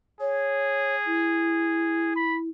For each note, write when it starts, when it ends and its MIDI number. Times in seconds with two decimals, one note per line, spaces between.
0.21 2.15 68
0.21 0.95 73
1.07 2.50 64
2.16 2.38 83